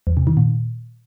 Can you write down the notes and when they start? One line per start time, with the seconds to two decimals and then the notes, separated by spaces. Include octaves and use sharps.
0.07 E2
0.17 C3
0.27 D#3
0.37 A#2